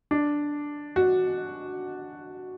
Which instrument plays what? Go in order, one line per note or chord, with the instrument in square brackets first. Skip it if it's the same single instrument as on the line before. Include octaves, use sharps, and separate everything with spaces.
[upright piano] D4
F#4